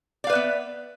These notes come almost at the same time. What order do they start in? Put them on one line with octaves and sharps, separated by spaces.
D5 F5 B4 E5 B3